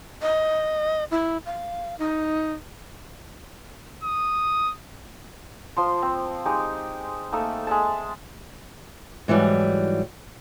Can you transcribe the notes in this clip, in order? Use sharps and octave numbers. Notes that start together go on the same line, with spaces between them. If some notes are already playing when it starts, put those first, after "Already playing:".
D#5
E4
F5
D#4
D#6
F3 C6
C4
G#3 D#4 G4
A3 A#3 D#4 A4
G#3 E5 A5
G#2 E3 F#3 G3